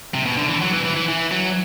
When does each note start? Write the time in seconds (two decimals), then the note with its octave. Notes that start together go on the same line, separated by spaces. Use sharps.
0.14 C3
0.26 B2
0.37 D3
0.49 E3
0.61 F#3
0.73 E3
0.85 E3
0.96 E3
1.08 E3
1.31 F#3